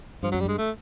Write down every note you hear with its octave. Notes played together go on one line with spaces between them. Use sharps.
G2 F3
F#3
F#2
G3
G2 G#3
A3